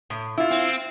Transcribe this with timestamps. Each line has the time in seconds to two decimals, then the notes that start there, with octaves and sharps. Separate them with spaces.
0.10 A2
0.38 E4 F4
0.51 C4